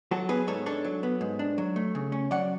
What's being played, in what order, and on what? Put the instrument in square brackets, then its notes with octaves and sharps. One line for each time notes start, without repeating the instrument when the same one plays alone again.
[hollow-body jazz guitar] F#3 F#4 A4
B3 G#4 B4
G#2 A4 C#5
D4 A4 C#5
F#3
B3
G#2
D4
F#3
A3
C#3
C#4
F#3 D5 F#5